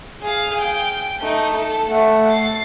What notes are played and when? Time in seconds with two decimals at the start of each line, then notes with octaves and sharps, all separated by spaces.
0.22 G#4 F5
0.61 G5
1.21 A3 D#4
1.54 A4
1.89 A3 F#5
2.30 A6 C7